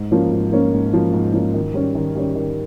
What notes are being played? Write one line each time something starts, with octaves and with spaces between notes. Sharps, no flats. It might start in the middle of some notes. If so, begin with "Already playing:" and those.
Already playing: G#2
F3 A#3 C#4
G#2
F3 A#3 C#4
G#2
F3 A#3 C#4
G#2
F3 A#3 C#4
D#3
G3 C#4
D#3
G3 C#4
D#3